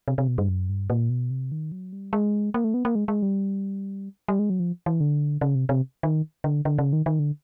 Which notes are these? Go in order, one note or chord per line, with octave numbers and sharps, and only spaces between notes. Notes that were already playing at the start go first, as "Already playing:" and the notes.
C3
C3
B2
G2
F#2
G2
A#2
B2
C3
D#3
F#3
G3
G#3
A#3
A3
B3
A#3
G#3
G#3
G3
G3
G#3
F#3
F3
E3
D3
C#3
C3
C3
D#3
D3
D3
C#3
D#3
D#3
D3